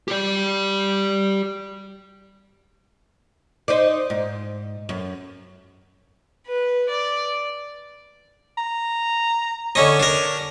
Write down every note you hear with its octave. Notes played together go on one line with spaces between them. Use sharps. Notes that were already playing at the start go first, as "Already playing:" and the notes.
G4 D5
D#4 C5 D5
G#2
F#2
B4
D5
A#5
D3 C#4 C#5 D#5
D4 A#4 C#5